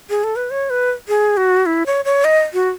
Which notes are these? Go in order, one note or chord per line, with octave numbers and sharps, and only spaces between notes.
G#4
A4
B4
C#5
B4
G#4
F#4
E4
C#5
C#5
D#5
F#4